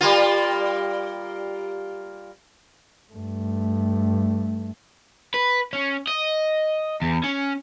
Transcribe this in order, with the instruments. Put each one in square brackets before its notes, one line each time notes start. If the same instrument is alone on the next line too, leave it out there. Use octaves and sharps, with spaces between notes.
[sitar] G3 A#3 F4
[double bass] G2 A3
[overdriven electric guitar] B4
C#4
D#5
E2
C#4